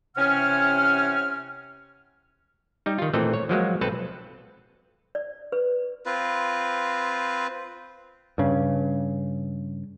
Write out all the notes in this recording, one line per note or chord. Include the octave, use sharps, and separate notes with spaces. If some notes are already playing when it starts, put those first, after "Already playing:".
C3 E3 C4 C#4 F#5 F6
G3 D#4
D#3 F4
A#2 E3 A3 C4 A4 D#5
C#5
F3 F#3 G#3 A#3
B1 C4 A4 B4 A5
D5
B4
C4 F4 B4
G2 C#3